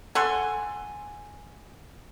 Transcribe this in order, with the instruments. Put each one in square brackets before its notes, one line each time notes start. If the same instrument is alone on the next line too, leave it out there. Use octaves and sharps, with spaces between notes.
[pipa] A4 F#5 C6 [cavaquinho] G#5